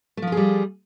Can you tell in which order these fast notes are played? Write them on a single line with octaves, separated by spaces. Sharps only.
A3 F3 F4 G#4 G3